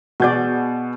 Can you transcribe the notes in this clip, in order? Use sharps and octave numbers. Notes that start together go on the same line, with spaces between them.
B2 F#4 G#4 D5 G6